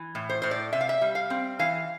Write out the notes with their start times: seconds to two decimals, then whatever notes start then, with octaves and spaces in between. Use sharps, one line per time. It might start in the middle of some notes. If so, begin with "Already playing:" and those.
Already playing: E3
0.15 A2
0.29 C5
0.42 A2 C5
0.51 D5
0.73 C3 E5
0.81 F5
0.89 E5
1.01 G3
1.15 F5
1.30 C4
1.59 E3 F5